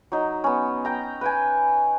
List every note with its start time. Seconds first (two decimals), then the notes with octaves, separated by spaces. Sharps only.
0.12 F#3 D#4
0.44 B3 C#4
0.85 G5 A#5
1.21 B4 G5 G#5